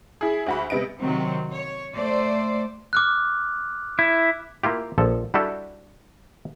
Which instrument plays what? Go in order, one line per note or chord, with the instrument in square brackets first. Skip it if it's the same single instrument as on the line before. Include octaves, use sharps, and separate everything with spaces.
[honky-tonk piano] E4 G#4
D2 F#4 B5
C3 G3 B3 D#5 D7
[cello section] C3 D#3 F#3 C4
C#5
A3 C5 D5
[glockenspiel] D6 F6 F#6
[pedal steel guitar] E4
[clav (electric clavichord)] A#3 E4 F4 G4
A#1 F3 A4
G3 D4 E4 F#4 G4 A4